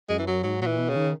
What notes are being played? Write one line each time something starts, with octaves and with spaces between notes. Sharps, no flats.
F#2 G#3
E3
F#3
G#2 F#3
A#2 E3 F#3
B2
C#3
D#3